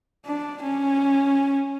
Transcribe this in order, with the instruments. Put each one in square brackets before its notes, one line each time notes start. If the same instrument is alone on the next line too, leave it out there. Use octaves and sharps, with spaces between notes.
[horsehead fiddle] D4
C#4